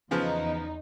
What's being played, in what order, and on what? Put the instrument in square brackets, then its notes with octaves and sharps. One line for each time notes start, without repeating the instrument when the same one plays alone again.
[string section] E2 D#4 [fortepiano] C#3 F3 B3